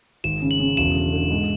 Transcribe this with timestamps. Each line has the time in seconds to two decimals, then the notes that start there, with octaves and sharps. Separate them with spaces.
0.24 G#1 E7
0.42 C#3
0.51 F#7
0.60 C#3
0.77 E1 E7
0.95 D3
1.12 D3
1.31 G#2